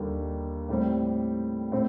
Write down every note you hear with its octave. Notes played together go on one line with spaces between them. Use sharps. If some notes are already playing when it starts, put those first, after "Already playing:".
Already playing: D#2 D3 G3 A#3
A2 G3 C4
A2 C4